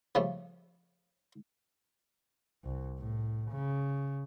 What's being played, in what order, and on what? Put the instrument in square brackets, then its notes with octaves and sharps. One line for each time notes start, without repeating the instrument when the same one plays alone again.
[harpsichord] C#3 F3 G3 A3
[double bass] C2
A2
C#3